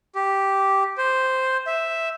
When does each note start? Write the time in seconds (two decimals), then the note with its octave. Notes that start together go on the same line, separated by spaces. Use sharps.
0.15 G4
0.98 C5
1.67 E5